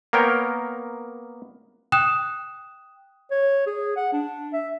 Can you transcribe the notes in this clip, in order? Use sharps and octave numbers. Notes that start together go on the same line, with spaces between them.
A#3 B3 A#4 C#5 G5
G5 D#6 F#6 E7
C#5
G#4
F#5
D4
E5